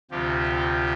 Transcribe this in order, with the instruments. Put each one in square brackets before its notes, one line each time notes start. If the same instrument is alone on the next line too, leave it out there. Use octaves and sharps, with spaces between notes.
[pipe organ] D2 C3 F3 G4